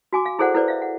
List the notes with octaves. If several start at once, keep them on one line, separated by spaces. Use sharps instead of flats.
F#4 G#5 D6
F5
E4 G#4 A4 C5 D5 F#5
E4 A4 B4 C5 D5
E5 F5
F#5